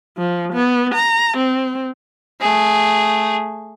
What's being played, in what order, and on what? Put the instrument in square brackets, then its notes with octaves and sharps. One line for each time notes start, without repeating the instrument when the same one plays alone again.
[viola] F3
B3
A#5
C4
[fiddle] A3 G#4